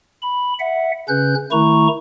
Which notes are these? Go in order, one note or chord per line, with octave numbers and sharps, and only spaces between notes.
B5
E5 F#5
C#3 C#4 B4 F#6 G6
D#3 A3 E4 A#5 C#6